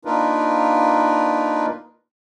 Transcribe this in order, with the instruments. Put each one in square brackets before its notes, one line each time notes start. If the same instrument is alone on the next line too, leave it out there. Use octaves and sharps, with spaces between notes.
[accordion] A#3 D4 D#4 F4 A#4 B4